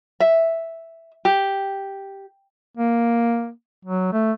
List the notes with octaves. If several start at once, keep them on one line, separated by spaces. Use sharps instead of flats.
E5
G4
A#3
F#3
A3